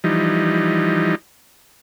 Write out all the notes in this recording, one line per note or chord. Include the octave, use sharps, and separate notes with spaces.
E3 F3 G3 D#4